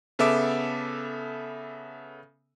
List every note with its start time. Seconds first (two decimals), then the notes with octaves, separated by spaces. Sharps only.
0.19 C#3 B3 A4 E5 D6